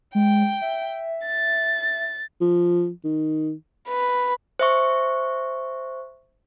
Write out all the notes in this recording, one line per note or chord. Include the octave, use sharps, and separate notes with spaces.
G#3 G5
E5
A6
F3
D#3
B4
C5 E5 C#6